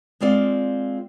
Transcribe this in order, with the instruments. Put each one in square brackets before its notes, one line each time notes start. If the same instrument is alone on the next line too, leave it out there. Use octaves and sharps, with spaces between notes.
[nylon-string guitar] G#3 C4 F4 D5